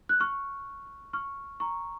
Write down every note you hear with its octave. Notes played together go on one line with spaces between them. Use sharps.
F#6
C#6 F6
C#6 F6
A#5 C#6